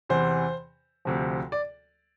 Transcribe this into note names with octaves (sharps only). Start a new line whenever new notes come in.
E2 C3 E3 C5
D2 C3 F3
D5